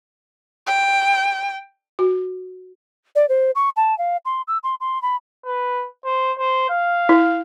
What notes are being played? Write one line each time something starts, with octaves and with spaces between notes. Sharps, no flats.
G5
F#4
D5
C5
C#6
A5
F5
C6
E6
C6
C6
B5
B4
C5
C5
F5
E4